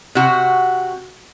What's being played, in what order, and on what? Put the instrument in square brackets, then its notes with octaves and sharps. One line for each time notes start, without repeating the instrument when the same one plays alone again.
[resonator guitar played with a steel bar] C3 F#4